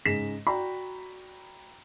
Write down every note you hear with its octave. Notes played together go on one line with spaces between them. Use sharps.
G#2 C#3 G#4 A#6 B6 E7
F#4 D5 G5 A#5 B5